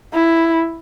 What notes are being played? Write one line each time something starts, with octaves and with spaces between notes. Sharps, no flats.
E4